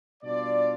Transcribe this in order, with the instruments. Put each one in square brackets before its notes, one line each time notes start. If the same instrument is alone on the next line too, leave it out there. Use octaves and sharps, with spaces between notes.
[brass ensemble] B2 G3 D4 F4 D5